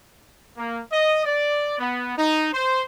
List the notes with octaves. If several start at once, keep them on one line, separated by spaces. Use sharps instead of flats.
A#3
D#5
D5
B3
D#4
C5